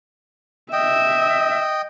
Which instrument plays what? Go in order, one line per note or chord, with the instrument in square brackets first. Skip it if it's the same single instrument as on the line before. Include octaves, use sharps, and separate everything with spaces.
[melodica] D#5 G5 [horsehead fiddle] E5